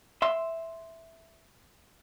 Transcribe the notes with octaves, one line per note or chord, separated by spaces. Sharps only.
E5 C6